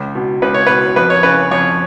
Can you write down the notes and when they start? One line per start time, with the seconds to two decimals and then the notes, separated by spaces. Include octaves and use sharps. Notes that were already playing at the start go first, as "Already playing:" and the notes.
Already playing: C#2
0.15 B2
0.42 C#2 B4
0.54 C#5
0.67 B2 B4
0.96 F2 B4
1.10 C#5
1.23 C#3 B4
1.51 F2 C#5